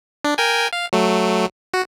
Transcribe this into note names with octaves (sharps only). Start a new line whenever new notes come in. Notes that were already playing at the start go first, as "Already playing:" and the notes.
D4
A#4 G5 G#5
F5
F#3 A3
F#4